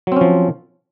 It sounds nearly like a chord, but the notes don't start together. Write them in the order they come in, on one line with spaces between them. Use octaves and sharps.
F#3 C4 C#4 F3